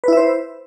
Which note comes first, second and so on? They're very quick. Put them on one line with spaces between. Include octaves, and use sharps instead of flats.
B4 E4 E5 C5